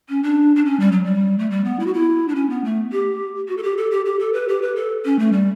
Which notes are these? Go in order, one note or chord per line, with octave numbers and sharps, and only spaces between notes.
C#4
D4
D4
C#4
G3
F#3
G3
A3
G3
B3
E4
F#4
E4
D4
C#4
B3
A3
G4
F#4
A4
G4
A4
G4
G4
A4
B4
G4
B4
A4
C#4
A3
G3